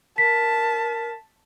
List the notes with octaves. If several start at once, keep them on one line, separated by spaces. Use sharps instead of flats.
A#4 A5 B6